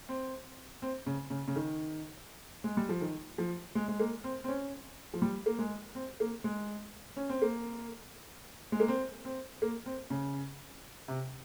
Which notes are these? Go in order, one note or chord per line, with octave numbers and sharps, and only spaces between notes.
C4
C4
C#3
C#3
C#3
D#3
G#3
G3
F3
D#3
F3
G#3
G#3
A#3
C4
C4
C#4
F3
G3
A#3
G#3
C4
A#3
G#3
C#4
C4
A#3
G#3
A#3
C4
C4
A#3
C4
C#3
C3